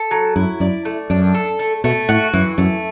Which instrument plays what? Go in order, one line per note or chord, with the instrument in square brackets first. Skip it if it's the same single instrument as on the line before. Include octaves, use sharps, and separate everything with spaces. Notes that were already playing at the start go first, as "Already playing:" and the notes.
Already playing: [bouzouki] A4
F#3
[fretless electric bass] F#2 [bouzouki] E4
[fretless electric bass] F#2 [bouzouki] D5
[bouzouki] A3
[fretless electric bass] F#2 [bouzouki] D4
[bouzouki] A4
A3
[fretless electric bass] B2 [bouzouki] A3
[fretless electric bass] A2 [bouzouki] F#4
[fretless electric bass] F#2 [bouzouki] E3
[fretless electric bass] F#2 [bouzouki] A3